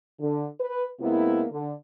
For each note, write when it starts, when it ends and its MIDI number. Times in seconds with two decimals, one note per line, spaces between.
0.20 0.46 50
0.60 0.86 71
1.00 1.44 48
1.00 1.44 56
1.00 1.44 58
1.00 1.44 59
1.00 1.44 64
1.51 1.72 50